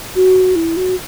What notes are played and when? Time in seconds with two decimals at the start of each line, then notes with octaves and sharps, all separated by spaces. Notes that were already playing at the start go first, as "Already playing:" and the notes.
0.16 F#4
0.56 E4
0.77 F#4